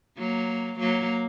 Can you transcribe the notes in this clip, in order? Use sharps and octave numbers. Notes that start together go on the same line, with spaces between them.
F#3 A#3
F#3 A#3